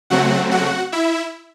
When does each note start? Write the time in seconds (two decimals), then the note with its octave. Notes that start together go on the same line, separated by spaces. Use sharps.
0.10 C#3 F#3 A3 C4 F#4 F#5
0.51 F#4 F#5
0.92 E4 E5